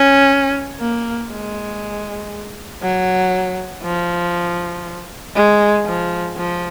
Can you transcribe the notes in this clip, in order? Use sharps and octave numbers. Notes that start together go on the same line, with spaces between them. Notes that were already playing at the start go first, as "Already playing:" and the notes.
Already playing: C#4
A#3
G#3
F#3
F3
G#3
F3
F3